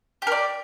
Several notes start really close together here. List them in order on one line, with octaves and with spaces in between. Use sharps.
G4 A#4 D5